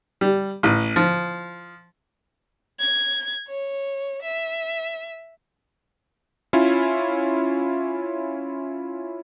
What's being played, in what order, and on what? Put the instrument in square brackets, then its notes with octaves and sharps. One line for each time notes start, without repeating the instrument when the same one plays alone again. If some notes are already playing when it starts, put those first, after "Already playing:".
[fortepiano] G3
A1
F3
[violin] G#6
C#5
E5
[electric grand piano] C#4 E4 F4 C#5